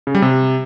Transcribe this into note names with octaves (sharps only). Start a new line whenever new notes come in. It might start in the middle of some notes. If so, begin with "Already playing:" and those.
C#3
G3
C3